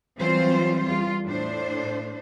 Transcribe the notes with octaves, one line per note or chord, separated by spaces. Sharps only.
E3 F#3 G3 C4 F4 C5
E2 G3 F4
A2 D4 C5